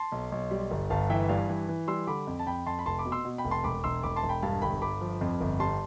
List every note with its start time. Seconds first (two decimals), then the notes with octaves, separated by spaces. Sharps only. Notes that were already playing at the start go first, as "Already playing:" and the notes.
Already playing: A5 C6
0.12 B1
0.32 B1
0.51 G3
0.71 G1
0.90 G1 F5 A5
1.10 E3 E5 G5
1.29 G2 D5 F5
1.49 E3
1.68 E3
1.88 G3 C6 E6
2.07 D3 B5 D6
2.27 F2
2.39 A5
2.47 F2 G5 B5
2.66 F2 A5 C6
2.79 B5
2.86 F1 A5 C6
2.99 B5 D6
3.05 B2
3.12 C6 E6
3.25 B2
3.38 G5 B5
3.44 F1
3.51 A5 C6
3.64 E1 B5 D6
3.84 E1 C6 E6
4.03 E1 B5 D6
4.16 A5 C6
4.23 E1
4.29 G5 B5
4.43 G2 F5 A5
4.62 G1 G5 B5
4.82 G1 B5 D6
5.01 F3
5.21 F2
5.40 G1
5.60 G3 A5 C6